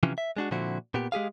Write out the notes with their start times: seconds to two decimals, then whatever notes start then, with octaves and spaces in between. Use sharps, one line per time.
0.03 C3 E3 F3 C#4
0.18 E5
0.37 G#3 D4 F#4
0.51 A#2 D3 F3 C4 E4 F#4
0.94 A#2 B3 G4
1.12 G#3 G4 G#4 F5